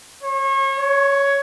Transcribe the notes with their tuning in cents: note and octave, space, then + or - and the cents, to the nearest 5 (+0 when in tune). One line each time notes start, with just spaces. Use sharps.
C#5 -35
C#5 +10